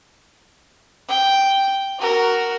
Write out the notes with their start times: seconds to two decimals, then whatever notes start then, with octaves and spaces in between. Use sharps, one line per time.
1.09 G5
1.98 F#4 A#4